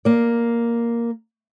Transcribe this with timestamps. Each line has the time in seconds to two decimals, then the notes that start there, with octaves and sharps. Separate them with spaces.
0.05 A#3 D5